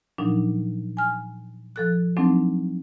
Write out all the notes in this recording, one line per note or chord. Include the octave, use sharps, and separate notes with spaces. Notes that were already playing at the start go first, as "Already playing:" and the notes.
A#2 F3 F#3 D4 D#4
G#5 F6
F3 A4 F#6
F3 F#3 A3 C4 D4 D#4